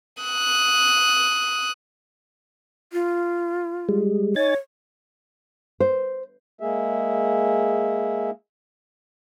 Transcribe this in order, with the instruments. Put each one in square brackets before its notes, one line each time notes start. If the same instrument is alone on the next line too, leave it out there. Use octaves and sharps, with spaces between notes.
[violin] D#6 F#6
[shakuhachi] F4
[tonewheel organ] G3 G#3
[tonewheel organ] D#4 G#5 A6 [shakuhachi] C#5
[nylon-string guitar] C5
[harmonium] G#3 A#3 G#4 E5